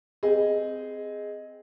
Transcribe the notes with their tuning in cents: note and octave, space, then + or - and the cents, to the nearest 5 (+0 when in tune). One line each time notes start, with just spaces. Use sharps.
C4 -15 G#4 +0 D#5 +0